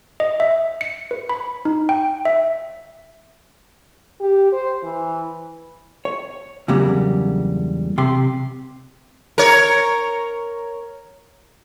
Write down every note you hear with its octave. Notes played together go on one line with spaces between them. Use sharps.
D#5
E5
C#7
B4
B5
D#4
G5
E5
G4
C5
E3
C#5
E2 G2 C#3 F#3 G3 A#3
C3 G4 C6
A#4 C#5